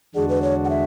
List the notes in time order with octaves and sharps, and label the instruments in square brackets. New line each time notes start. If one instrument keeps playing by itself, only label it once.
[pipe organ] E2 D3 G#3 D4 F#4 [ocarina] G#4
[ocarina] B4
C#5
F#5
E5